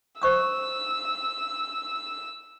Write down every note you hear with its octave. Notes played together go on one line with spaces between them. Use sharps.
C5 C#6 D#6 E6